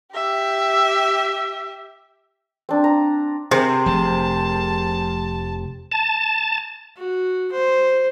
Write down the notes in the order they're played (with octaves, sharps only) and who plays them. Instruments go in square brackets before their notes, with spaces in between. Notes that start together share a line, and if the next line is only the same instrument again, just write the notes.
[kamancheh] G4 E5
[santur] C4 D4
A#5
[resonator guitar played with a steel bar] C3 [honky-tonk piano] G#4 A#4 C5
[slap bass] F1 F3 A3 [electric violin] A5
[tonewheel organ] A5
[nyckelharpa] F#4
C5